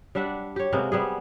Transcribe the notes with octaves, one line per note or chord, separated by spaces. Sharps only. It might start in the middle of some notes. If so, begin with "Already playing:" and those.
G3 D4 E5 F#5
G4 C#5
C3 G#3 A#3 B3
G3 B3 G#4